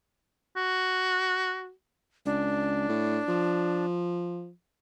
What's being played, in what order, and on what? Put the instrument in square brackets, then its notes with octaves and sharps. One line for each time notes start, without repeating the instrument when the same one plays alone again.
[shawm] F#4
[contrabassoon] C#2 [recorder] D4
[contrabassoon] A2
F3